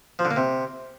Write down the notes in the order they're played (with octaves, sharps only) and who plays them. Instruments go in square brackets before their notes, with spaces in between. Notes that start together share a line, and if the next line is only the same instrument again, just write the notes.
[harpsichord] F3
D3
A#3
C3